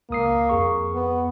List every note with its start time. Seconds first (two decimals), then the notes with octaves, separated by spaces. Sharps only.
0.10 C#2 A#3 D#6 C7
0.49 F2 G#4 C#6
0.94 B3